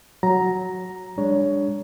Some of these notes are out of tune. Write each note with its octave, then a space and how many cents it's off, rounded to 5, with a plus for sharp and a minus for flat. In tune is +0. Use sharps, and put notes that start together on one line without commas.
F#3 +0 A#5 +5
G#3 -45 D4 +0 C#5 +15